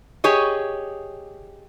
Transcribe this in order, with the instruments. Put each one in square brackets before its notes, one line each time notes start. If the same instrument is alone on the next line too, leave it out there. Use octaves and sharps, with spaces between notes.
[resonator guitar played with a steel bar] G4 G#4 C#5 D#5